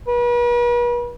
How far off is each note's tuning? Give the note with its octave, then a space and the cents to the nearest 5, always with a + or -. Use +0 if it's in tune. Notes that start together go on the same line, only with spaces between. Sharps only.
B4 -40